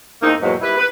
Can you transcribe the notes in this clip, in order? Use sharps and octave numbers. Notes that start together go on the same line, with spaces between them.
E2 A#3 C4 D#4
E2 G#2 B2 F#3 A#3
G3 E4 B4
B4